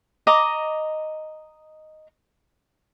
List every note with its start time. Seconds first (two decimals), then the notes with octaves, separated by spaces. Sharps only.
0.27 D#5 A#5 D6